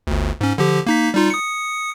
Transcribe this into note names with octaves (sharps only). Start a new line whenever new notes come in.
G1 D2
G#2 C#4
D3 F3 G4
A#3 D#4 B6
G3 D#4 F4
D#6 C#7